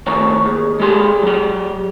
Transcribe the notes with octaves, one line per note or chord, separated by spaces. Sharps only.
A2 D#3 C#5 C#6
D#2 G#4
G#3 G4 C6
F#3 G4